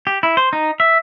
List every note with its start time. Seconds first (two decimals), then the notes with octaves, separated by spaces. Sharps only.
0.07 G4
0.23 E4
0.37 C5
0.53 D#4
0.80 E5